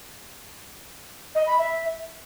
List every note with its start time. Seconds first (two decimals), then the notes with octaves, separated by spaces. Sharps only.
1.35 D#5
1.47 B5
1.58 E5